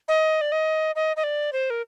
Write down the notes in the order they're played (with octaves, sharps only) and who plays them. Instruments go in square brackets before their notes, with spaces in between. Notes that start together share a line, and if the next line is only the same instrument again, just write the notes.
[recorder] D#5
D5
D#5
D#5
D#5
D5
C5
A#4